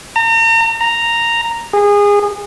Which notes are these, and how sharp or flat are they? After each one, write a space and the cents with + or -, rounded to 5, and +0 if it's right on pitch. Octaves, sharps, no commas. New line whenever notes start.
A#5 -40
A#5 -5
G#4 -25